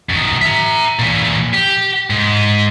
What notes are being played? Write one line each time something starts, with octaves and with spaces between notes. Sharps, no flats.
F#2 D#3
E5 A#5
A#2 E3
G4
G#2